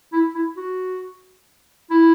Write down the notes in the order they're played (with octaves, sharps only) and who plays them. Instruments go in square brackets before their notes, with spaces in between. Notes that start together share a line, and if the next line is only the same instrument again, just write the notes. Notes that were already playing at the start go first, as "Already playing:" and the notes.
[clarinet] E4
E4
F#4
E4